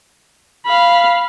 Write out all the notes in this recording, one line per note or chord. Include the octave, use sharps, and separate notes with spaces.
F5 B5